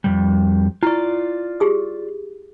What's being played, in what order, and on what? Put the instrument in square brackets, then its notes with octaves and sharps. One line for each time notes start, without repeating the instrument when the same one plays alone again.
[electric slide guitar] F2 C3 G3
[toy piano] E4 C#6 [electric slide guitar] F4 D5
[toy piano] G4 G#4 D#6